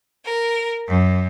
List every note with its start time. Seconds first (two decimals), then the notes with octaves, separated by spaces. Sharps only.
0.24 A#4
0.88 F#2